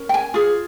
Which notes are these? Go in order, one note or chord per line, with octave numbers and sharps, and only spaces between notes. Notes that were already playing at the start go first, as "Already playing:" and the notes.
Already playing: C#4 A#4
G5
G#5
F4 G#4